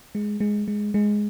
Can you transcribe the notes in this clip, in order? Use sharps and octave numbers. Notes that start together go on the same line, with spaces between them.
G#3
G#3
G#3
G#3